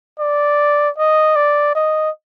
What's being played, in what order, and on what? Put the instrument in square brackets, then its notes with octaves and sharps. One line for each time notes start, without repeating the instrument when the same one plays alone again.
[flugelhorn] D5
D#5
D5
D#5